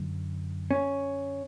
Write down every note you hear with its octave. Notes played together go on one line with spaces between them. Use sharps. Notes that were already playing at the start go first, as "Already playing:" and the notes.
Already playing: F#2 D3
C#4